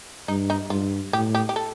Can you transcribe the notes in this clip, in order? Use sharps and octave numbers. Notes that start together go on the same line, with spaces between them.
G2 D#4
D#4
G2 F4
A2 G4
G4
G4
A4